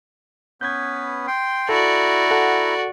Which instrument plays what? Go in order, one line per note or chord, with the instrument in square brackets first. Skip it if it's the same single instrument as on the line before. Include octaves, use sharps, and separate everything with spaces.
[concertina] B3 C#4 B4 [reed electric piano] G6 G#6
[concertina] G5 C6
[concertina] E4 A#5 [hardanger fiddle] F#4 D5 [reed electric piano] A4
[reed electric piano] A4 F#5